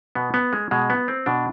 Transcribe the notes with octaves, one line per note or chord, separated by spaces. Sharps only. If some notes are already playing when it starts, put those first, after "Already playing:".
B2 B3
B3
G#3
B2 G#3
B3
C4
B2 D4